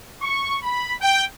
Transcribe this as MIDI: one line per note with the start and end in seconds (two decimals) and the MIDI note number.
0.22 0.56 85
0.63 0.93 83
1.01 1.23 79